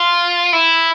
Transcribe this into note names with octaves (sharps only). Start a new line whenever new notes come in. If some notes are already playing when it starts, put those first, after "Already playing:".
Already playing: F4
E4